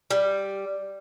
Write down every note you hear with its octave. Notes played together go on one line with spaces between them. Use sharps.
G3